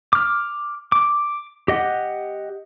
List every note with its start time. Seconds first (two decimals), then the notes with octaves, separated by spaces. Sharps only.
0.13 D6 F6
0.92 D6
1.68 G4 D#5 F#5